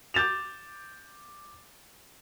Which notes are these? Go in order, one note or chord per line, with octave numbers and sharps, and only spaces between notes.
D6 G6 A6 E7 F7